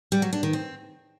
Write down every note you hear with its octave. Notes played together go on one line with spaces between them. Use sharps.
G3
F#3
D4
D#3
C4